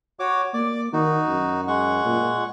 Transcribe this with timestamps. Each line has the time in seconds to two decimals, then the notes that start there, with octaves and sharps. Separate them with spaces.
0.19 F#4 C#5 D6
0.54 A#3 D5 D6
0.93 D#3 D#4 F#4
1.28 F#2
1.68 G#3 F#5 C#6
2.05 A#2